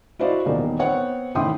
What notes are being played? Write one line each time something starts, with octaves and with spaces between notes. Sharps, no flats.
E4 F#4 C5 D5 D#5 F5
D#1 E2 D#4 A#4 D5
B3 C4 C#5 F#5
A1 D#3 E4 G5 C6 D#6